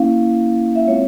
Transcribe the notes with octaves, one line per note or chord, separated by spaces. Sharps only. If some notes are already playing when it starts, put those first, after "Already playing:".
Already playing: A#3 C#4 E4 F5
E5
G#3 C4 F4 C#5